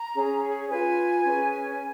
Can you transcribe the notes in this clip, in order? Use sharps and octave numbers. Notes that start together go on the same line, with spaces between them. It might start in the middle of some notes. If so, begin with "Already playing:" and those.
Already playing: A#5
C#4 G#4 C#5
F4 B4 G#5
C#4 G#4 B4